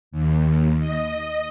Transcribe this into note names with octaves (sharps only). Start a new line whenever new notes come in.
D#2
D#5